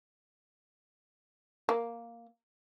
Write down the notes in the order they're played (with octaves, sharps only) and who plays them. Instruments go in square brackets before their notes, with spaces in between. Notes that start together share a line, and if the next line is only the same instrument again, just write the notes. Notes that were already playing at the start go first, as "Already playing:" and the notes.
[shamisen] A#3